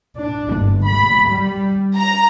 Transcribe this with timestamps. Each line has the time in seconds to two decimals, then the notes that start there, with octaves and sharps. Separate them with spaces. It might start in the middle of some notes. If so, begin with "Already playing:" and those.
0.19 D4
0.55 G1
0.88 B5
1.30 G3
1.96 A#5